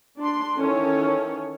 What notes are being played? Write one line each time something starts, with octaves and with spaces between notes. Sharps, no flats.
D4 C6
D#3 E3 C#4 A4 C#5